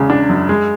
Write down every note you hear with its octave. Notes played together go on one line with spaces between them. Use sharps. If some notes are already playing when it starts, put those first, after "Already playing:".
Already playing: E2 C#3 G#3
D4
F#2
G#3